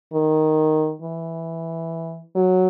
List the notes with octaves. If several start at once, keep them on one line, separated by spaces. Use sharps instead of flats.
D#3
E3
F#3